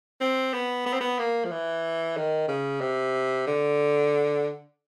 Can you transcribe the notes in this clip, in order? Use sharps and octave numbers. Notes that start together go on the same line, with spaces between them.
C4
B3
B3
C4
B3
A#3
F3
E3
D#3
C#3
C3
D3